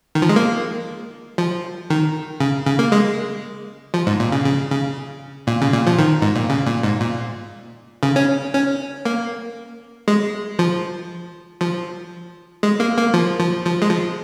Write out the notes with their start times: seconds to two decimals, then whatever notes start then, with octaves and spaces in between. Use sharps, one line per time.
0.15 D#3
0.22 F3
0.29 G#3
0.36 A#3
1.38 F3
1.90 D#3
2.40 C#3
2.66 C#3
2.79 A#3
2.92 G#3
3.94 F3
4.07 G#2
4.20 A#2
4.32 C#3
4.45 C#3
4.71 C#3
5.47 A#2
5.62 C#3
5.73 A#2
5.87 F3
5.99 D#3
6.22 G#2
6.36 A#2
6.50 C#3
6.67 A#2
6.83 G#2
7.00 A#2
8.03 C#3
8.16 C#4
8.54 C#4
9.05 A#3
10.08 G#3
10.59 F3
11.61 F3
12.63 G#3
12.80 A#3
12.97 A#3
13.14 F3
13.40 F3
13.66 F3
13.82 G#3
13.90 F3